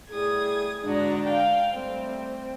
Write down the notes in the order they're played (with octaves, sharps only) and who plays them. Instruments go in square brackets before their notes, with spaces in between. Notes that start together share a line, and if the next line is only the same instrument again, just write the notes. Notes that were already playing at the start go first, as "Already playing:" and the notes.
[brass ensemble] A2 G3 G#4 [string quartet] D#6 G#6
[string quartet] G#2 F#4 A#5 [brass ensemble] D3 D4
[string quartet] F5 G5
[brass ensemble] G3 A3 [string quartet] C4